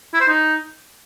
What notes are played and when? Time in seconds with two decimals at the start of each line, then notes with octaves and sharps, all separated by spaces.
0.14 E4
0.21 C5
0.28 D#4